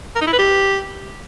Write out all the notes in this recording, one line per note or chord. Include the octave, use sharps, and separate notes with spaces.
A#4
D#4
E4
B4
G4